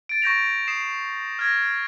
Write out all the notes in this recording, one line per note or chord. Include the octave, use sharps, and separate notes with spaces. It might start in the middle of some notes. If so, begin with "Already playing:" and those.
A6 D7
C#6 G6 A#6 F7
D#6 C7 E7
F6 G#6 A#6